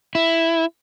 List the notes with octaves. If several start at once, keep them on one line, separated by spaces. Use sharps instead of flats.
E4